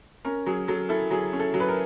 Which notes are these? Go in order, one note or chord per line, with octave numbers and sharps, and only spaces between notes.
C#4 A#4
F#3 G#4
F#3 A4
E4 A4
F#3 G#4
C#4
A4
F#3
B4
A#4